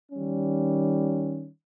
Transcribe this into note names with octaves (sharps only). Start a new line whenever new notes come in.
D#3 G3 C#4